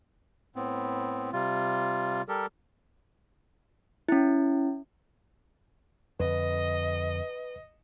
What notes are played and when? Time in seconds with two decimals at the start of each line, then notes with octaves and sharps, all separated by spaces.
0.56 A2 B3 C4
1.33 C3 G3 F4
2.28 G3 G4 A4 A#4
4.08 C#4 E4
6.20 F2 D3 B4 D#5